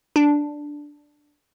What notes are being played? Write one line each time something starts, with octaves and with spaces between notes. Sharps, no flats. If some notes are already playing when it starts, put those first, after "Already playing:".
D4